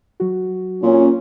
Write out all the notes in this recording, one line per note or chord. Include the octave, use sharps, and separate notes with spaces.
F#3 F#4
A#2 C#4